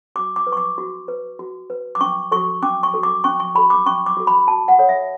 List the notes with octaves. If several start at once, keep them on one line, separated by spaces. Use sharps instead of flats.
F#4 D6
D6
B4
C#6
D6
F#4
B4
F#4
B4
D6
C#4 C#6
F#4 A4 C#6
C#4 D6
C#6
F#4 A4
D6
C#4 C#6
C#6
F#4 A4 B5
D6
C#4 C#6
D6
F#4 A4
B5
F#4 A5
F#5
A4 C#5
E5